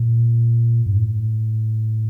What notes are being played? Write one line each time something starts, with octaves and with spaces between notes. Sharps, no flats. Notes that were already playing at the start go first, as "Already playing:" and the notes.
Already playing: A#2
G2
A2